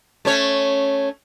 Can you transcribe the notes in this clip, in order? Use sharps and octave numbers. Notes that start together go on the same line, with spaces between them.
A3 C#4 C#5